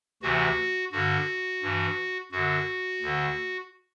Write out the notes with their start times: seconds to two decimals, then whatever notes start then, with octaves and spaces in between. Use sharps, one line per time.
0.22 D2 C3 E3 F#4
0.92 G2 D3 F#4
1.62 G2 E3
2.32 F#2 D3 F#4
3.02 D2 D3